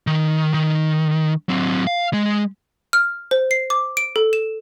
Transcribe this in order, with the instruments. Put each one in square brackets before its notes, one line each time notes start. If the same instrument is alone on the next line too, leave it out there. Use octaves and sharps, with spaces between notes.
[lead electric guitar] D#3
D#3
F#3 C4
F5
G#3
[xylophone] F6
C5
C7
D6
D7
A4
E7